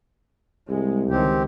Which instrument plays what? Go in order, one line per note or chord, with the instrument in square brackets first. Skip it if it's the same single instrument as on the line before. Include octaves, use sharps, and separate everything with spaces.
[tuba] C2 [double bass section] G#3
[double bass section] C#2 D#3 [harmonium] C4 G4